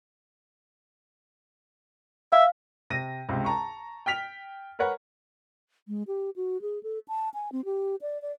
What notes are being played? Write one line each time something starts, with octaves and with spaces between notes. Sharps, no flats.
E5 F5
C3 A#6 D#7
C#2 C3
A5 A#5 C#6
G5 F6 B6 F7
A#4 B4 C#5 F#5 A#5
G#3
G4
F#4
G#4
A4
A5
G#5
C4
G4
D5
D5